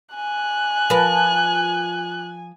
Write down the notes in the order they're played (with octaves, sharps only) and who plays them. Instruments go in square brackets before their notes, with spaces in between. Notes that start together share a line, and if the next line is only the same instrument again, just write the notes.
[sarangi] G#5 [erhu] F#6
[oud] F3 A#4 B4